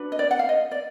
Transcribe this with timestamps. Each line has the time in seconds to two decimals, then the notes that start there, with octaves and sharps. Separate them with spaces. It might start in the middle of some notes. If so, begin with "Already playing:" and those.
Already playing: D4 F#4 B4
0.12 D#5
0.19 D5
0.31 F#5
0.39 F5
0.49 D#5
0.71 D5